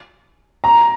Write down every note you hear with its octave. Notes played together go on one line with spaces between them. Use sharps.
A#5